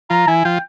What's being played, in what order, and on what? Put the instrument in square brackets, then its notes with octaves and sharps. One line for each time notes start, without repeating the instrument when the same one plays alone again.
[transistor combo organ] F3 F4 [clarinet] A#5
[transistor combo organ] E3 E4 [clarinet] G#5
[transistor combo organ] F3 F4 [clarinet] G5